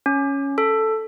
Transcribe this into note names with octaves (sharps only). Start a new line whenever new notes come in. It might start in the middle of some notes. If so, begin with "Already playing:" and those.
C#4
A4